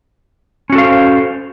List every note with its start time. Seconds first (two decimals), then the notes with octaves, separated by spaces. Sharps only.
0.70 C#4
0.72 F#4
0.75 A4
0.78 F5
0.81 C5